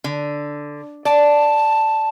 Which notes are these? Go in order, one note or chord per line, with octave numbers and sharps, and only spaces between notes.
D3
D5 A5